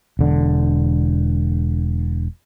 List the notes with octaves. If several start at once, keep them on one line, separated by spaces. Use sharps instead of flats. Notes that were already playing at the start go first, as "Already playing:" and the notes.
E1 D3